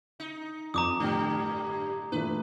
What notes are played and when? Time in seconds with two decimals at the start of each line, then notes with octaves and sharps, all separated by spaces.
0.20 D#4
0.74 F2 A#5 D6 D#6
1.00 F#2 A2 D3 G3
2.12 A#2 E3 A3 B4